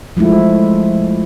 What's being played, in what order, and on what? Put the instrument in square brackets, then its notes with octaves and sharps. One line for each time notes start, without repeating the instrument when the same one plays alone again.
[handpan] F3 G#3 A3 E4